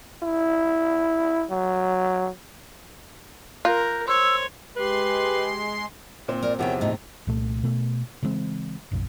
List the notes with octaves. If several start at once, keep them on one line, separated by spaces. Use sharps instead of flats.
E4
F#3
F4 A#4 F#6 G6 A#6
C5 C#5 C6 E6
G#3 G4 B4 C6
A#2 C4
A#4 D5
E2 C3 F3 A#4 C#5 F#5 G5
A2 D#4 D#5
C2 A#2 A3
B2 A3
C#3 E3 G#3 C4
F#1 B1